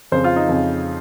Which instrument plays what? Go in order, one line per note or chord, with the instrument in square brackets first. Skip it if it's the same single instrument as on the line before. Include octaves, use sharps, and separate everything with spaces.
[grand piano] F2 C#3 C5
F4
D#4
F2 C#3